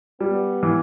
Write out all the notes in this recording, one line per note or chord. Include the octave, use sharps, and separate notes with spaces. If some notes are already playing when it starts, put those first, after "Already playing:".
G3 B3
E3